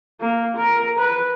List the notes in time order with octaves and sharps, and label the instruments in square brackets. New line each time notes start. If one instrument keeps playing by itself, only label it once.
[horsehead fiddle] A#3
A#4
B4